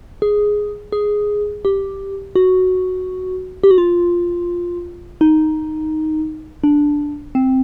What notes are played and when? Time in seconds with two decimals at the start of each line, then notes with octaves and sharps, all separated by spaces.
0.22 G#4
0.92 G#4
1.65 G4
2.35 F#4
3.64 G4
3.71 F#4
3.78 F4
5.21 D#4
6.64 D4
7.35 C4